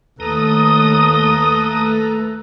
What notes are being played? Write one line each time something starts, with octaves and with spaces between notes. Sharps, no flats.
D#2 A3 A4 B4 A#5 D#6